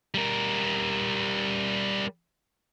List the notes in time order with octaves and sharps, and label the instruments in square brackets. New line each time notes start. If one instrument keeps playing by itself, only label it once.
[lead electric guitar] G3 A#4